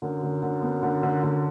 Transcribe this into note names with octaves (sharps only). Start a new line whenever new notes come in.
F#2 D3
D3
D3
B3
D3
D3
D3